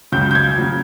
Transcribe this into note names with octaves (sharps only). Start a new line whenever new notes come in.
C#2 C#3 F#3 G6
G6
G#6
C#3 F#3